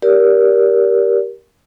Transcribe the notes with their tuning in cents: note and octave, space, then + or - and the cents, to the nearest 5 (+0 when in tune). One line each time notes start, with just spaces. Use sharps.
G4 +0 A#4 +15 D5 -30